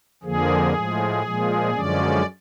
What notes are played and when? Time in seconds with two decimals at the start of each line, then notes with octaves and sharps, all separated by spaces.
0.23 F2 D3 F3 A#3 G#4
0.73 A2 F3 G#3
1.23 A#2 F3 G#3
1.73 F#2 D3 F3 G#3 C#4 D5